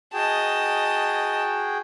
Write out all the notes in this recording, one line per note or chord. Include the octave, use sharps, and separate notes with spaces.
F#4 G#4 D#5 G5 A5